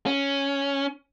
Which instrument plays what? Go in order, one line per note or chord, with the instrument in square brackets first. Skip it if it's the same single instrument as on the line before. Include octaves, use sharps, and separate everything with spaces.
[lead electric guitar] C#4